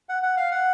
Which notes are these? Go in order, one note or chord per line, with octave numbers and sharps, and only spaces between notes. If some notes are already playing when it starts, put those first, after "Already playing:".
F#5
F#5
F5
F#5